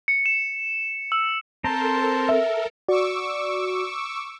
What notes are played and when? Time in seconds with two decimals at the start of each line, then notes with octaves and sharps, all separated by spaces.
0.08 C#7
0.26 E7
1.12 E6
1.64 C4 A4 A#4 C5 A5 A#5 C6
2.29 E5
2.88 F#4 D5 C#6 D6 E6